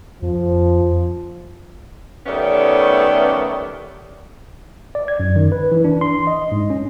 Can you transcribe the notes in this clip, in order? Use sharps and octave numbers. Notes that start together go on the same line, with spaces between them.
F2 F3
D#3 G3 A3 B3 C#4
D5
G#6
F#2
D#3
B4
E3
D4
C6
D#5
G#2
C#4